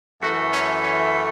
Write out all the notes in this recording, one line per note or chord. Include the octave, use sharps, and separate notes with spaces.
F#2 E3 A3 F#4
C#4
C#4